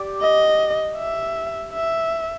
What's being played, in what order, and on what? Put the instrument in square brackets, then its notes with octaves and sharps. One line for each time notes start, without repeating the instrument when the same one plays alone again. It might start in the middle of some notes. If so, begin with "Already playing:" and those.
Already playing: [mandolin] G4 D5
[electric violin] D#5
E5
E5